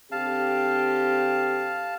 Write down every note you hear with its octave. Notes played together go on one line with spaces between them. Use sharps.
D3 C4 G4 F5 A5